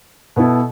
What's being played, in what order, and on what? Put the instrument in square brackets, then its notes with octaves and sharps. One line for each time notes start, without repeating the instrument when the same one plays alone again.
[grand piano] B2 B3 E4 A4